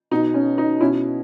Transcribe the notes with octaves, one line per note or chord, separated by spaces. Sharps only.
B2 D#4
C#4
D#4
B2 C#4 E4